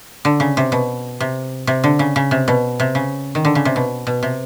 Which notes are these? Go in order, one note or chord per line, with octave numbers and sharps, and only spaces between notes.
D3
C#3
C3
B2
C3
C3
D3
C#3
C#3
C3
B2
C3
C#3
D#3
D3
C#3
C3
B2
B2
C3